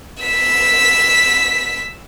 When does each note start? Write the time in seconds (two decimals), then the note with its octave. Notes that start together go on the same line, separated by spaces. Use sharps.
0.23 E6 B6